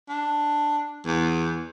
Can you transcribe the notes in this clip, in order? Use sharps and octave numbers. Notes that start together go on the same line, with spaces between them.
D4
E2